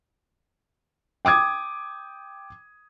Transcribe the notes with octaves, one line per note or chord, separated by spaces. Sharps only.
G5 D6 D#6 G#6